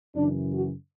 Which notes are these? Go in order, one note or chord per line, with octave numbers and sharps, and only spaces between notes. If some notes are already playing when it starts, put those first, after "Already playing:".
F#2 C#3 E3 D4
F#4